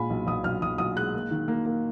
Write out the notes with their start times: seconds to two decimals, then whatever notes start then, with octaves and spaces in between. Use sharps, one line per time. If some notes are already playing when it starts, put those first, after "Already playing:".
Already playing: A#2 G#3 G#5 B5
0.10 B1
0.27 B1 D#6
0.44 B1 F6
0.62 B1 D#6
0.78 B1 D#6
0.96 G#3 F#6
1.14 A#3
1.31 D#3
1.48 A#3
1.65 A#3